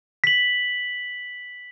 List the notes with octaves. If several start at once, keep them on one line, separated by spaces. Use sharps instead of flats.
B6 F#7